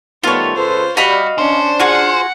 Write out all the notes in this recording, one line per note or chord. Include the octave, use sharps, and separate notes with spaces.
D#3 G3 A3 B3 F4 C#5
C#2 A4 B4 C5
G3 F#4 D#5 F5 B5
C#4 D4 C5
F4 F#4 G#4 F#5